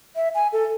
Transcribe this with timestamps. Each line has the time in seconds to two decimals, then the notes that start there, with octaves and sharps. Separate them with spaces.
0.16 E5
0.35 G#5
0.53 A4